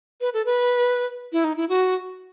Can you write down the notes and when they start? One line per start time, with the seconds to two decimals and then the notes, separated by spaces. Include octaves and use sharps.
0.21 B4
0.34 A4
0.46 B4
1.32 E4
1.44 D#4
1.57 E4
1.69 F#4